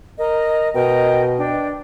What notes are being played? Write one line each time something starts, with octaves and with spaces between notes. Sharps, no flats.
A#4 D#5
B2 A#4 D#5 G5
D4 G5